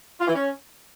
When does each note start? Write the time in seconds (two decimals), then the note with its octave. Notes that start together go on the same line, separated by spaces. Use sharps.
0.19 F4
0.27 E3
0.34 C#4